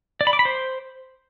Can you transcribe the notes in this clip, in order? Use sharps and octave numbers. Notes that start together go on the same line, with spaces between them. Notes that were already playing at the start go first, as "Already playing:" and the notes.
D5
B5
D6
B5
C5